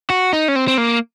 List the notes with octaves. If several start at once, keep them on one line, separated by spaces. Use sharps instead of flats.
F#4
D#4
C#4
C4
C4
A#3